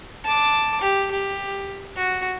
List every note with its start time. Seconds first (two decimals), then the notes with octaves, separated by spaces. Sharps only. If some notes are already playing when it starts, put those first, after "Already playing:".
0.24 A5 D6
0.81 G4
1.11 G4
1.96 F#4